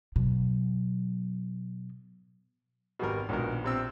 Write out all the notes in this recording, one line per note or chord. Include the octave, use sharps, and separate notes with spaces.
B2 F#3
G#1 B2 G3 F#4 A#4
A#1 G#2 B2 D#3 A#4
C3 C4 E6